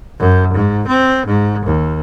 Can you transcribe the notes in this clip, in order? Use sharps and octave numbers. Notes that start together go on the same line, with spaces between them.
F#2
G#2
C4
G#2
D#2